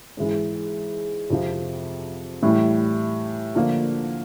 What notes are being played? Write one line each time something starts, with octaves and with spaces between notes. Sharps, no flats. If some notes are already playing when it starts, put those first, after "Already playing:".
G#2 E3 G#3
F2 C3 F3
A2 E3 G3
D3 F3 A#3